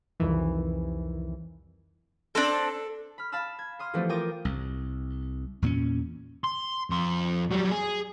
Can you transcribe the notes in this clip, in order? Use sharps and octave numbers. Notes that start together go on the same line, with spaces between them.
C2 F2 D#3 E3
C4 D4 A4
B5 F6
F5 A5 B5 E6 F6
G#6
C6 D#6 F6
E3 F3 G3 A3 B3 C4
F4 A#4 G5 D6 D#6
C2
E2 A#2 B3 C#4
C6
F2 C6
F#3 G3
G#4